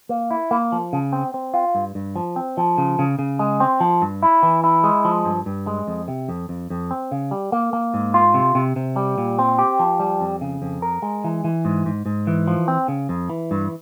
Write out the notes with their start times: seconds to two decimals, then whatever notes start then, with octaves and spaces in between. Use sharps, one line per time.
0.09 A#3
0.31 E4
0.51 A#3
0.72 F3
0.93 C#3
1.13 C4
1.34 C4
1.54 F4
1.75 G2
1.95 G2
2.16 F3
2.36 C4
2.57 F3
2.78 C#3
2.99 C#3
3.19 C#3
3.39 G#3
3.60 C4
3.80 F3
4.02 G2
4.23 E4
4.43 E3
4.64 E4
4.84 G#3
5.05 F3
5.25 G2
5.46 G2
5.67 G#3
5.88 F2
6.08 C3
6.29 F2
6.49 F2
6.70 F2
6.91 C4
7.12 C#3
7.31 G3
7.52 A#3
7.73 A#3
7.94 G#2
8.14 F4
8.34 C3
8.55 C3
8.76 C3
8.96 G3
9.18 A#2
9.39 C4
9.59 G4
9.79 F3
10.00 G3
10.21 F2
10.41 C#3
10.62 F2
10.82 A#4
11.02 G#3
11.24 E3
11.44 E3
11.65 G#2
11.86 G#2
12.06 G#2
12.27 E3
12.48 F3
12.68 C4
12.88 C#3
13.09 F2
13.29 E3
13.51 G2